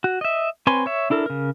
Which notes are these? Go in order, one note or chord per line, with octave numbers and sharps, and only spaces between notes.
F#4
D#5 E5
C4 B4 C#5 G#5 C6
C#5 E5
D4 E4 A4 A#4
C#3 A#4